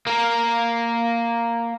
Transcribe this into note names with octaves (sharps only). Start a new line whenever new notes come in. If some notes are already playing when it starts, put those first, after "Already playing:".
A#3 A#4